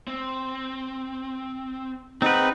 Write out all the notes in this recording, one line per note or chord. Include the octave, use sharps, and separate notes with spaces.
C4
C4 D#4 G#4 B4 F#5